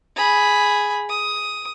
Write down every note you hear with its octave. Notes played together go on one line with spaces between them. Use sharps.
G#4 B5
D#6